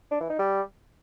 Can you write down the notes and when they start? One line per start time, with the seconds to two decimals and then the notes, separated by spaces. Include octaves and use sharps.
0.11 D4
0.20 E3
0.30 D#4
0.39 G3